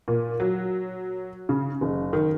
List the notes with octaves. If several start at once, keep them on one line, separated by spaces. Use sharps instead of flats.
A#2
F#3
C#3
F#1
D#3